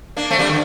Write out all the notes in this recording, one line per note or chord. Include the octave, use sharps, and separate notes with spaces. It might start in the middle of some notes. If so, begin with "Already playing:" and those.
A#3 D4
A3 C4
G3 A#3
D3